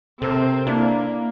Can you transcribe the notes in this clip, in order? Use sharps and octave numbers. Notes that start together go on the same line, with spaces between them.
C3 C4 A4 A#4
A#3 D4 E4